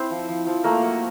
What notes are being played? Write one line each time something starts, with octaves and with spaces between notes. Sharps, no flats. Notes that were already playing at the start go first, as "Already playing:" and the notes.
Already playing: C4 E4 C5
F3
F3
F3
A3 A#3 A#4
F#3